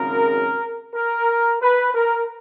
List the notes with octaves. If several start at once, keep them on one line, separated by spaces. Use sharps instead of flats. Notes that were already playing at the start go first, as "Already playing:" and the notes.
Already playing: G#1 F#2 C#3 A#4
A#4
B4
A#4